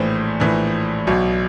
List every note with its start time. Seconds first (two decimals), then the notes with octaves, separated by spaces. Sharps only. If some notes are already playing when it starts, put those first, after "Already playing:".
Already playing: A#1 A2 E3 C5
0.40 A#1 A2 E3
1.07 B1 B2